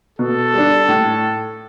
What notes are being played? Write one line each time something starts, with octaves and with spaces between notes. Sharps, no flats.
B2 A4
G3 D4
A2